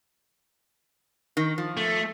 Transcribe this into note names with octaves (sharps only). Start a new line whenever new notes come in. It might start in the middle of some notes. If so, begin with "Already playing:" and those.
D#3
F3
A3